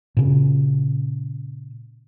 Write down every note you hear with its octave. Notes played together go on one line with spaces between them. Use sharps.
A#2 C#3